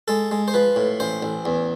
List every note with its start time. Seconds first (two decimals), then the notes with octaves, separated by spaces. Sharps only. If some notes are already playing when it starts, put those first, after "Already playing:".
0.08 G#3 A4
0.31 G#3
0.48 C5
0.54 F3 B4
0.76 A2
1.00 A1 C5
1.23 A1
1.45 E2